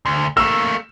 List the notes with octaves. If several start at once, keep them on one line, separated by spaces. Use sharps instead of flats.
D2
A3 A#3 E6